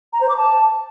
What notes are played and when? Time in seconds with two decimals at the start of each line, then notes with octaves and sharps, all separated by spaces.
0.13 A#5
0.21 C5
0.29 D6
0.37 A5